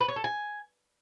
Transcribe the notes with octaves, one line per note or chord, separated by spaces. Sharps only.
B4
C#5
A4
G#5